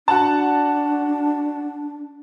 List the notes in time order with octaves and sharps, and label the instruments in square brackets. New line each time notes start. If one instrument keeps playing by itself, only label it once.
[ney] D4 [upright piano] F#4 F#5 A5